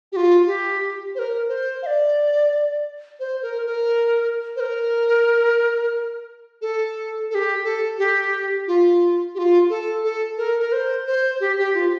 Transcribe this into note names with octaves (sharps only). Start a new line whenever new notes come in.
G4
F4
G4
C5
A#4
C5
F5
D5
C5
A#4
A#4
C5
A#4
A4
A4
G4
A4
G4
F4
G4
F4
A4
A4
A#4
A#4
C5
C5
G4
G4
F4